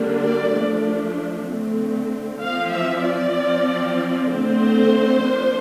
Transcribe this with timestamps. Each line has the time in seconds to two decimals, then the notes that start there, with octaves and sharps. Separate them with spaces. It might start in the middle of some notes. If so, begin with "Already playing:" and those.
Already playing: D3 G3 A#3 D4
0.24 D5
0.55 F3 A3 D4
1.48 D3 A3 C4
2.42 F3 C4 F5
2.73 E5
3.04 D5
3.36 F3 C4
4.30 D3 A3 C4 C5
5.24 F3 A#3 D4